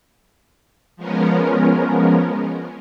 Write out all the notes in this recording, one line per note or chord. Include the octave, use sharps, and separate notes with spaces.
F3 G#3 B3 C#4 A#4